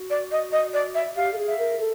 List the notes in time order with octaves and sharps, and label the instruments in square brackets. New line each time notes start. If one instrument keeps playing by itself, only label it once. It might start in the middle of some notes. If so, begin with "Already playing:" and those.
Already playing: [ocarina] F#4
[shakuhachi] D5
D#5
D#5
D5
E5
[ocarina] G4 [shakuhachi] F5
[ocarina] A4
G#4
[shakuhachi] E5
[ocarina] A#4
A4